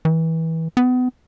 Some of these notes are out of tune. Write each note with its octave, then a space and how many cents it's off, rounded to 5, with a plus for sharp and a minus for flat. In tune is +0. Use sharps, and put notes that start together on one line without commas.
E3 -25
B3 +30